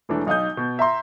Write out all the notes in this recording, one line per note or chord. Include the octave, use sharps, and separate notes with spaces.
E1 E3 A3 D4
B1 D#4 F5 D#6 G6
B2
E5 A#5 C6